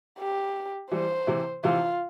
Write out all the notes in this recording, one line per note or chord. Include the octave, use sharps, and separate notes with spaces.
G4
E3 G3 C5
C3 E3
C3 E3 F4